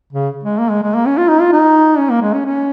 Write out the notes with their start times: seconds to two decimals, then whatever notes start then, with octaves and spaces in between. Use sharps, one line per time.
0.13 C#3
0.43 G#3
0.59 A#3
0.70 G#3
0.83 G#3
0.94 A#3
1.06 C#4
1.17 F4
1.29 D#4
1.41 F4
1.53 D#4
1.98 C#4
2.11 A#3
2.22 G#3
2.34 C#4
2.46 C#4